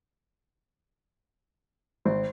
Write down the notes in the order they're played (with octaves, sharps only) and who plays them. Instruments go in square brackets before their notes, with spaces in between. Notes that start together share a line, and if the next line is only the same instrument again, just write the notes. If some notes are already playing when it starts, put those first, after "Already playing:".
[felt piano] G#1 [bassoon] C4